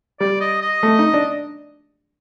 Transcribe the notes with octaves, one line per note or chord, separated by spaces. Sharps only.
G3 D5
D#5
D#5
A3
D#4
D4